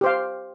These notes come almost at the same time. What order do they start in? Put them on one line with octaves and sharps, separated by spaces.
G4 C5 F5